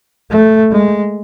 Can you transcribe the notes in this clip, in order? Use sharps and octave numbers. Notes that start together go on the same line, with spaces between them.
A3
G#3